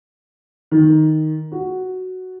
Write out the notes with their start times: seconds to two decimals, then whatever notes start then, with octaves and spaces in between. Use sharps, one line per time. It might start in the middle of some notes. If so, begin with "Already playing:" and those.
0.71 D#3
1.52 F#4